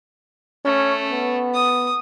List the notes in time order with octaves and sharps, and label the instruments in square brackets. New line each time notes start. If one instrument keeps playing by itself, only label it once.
[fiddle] A3 [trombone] C#4
[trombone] B3
[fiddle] D#6